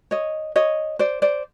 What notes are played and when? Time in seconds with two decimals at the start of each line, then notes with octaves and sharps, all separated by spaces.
0.11 C#5 D#5
0.56 C#5 D#5
0.99 C5 D5
1.22 C5 D5